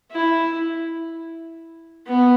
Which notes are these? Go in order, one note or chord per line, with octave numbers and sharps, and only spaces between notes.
E4
B3